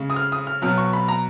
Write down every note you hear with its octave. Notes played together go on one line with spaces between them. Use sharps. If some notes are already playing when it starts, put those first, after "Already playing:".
Already playing: C#3 G#3
D#6
F6
D#6
F6
B2 F#3 F6
C#6
B5
A#5